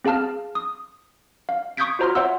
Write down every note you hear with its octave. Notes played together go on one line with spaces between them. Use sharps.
C4 G#4 F5 A5 F6
D#6
F5
C#6 D#6 G6 G#6 B6 D7
F4 F#4 C5 A#5 C6 F6
C5 C#5 E5 F#5 C6 E6